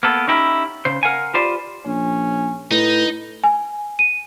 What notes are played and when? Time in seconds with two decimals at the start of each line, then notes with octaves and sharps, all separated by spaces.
0.03 A#3 B3 A4
0.27 C#4 D#4 E4 G4
0.85 C#3 C5
1.03 A#4 F5 F#5 G#5
1.34 F4 G4 B4 C5 D5 F5
1.85 A#1 C#4
2.71 A2 D#4 B4
3.44 G#5
3.99 D#7